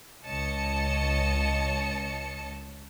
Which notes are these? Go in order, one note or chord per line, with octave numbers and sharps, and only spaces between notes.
C#2 C#5 D#5 A5 C#7